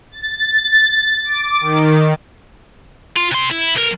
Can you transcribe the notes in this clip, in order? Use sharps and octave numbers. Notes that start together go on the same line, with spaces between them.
A6
D6
D#3
F4
C3 C6
E4
B1 A#4